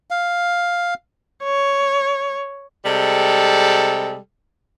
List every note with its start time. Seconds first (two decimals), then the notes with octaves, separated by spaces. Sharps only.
0.10 F5
1.43 C#5
2.84 C3 G3 G#3 A4